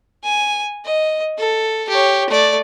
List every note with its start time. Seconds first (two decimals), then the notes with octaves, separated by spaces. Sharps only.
0.24 G#5
0.85 D#5
1.38 A4
1.89 G4 C#5
2.30 A3 D5